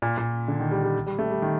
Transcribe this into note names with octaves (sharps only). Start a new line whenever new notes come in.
A#2
A#2
D3
D#3
G3
G3
G3
A3
G3
D#3